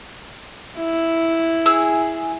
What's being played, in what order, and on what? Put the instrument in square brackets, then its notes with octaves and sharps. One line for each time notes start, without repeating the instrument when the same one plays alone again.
[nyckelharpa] E4
[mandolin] G#4 E6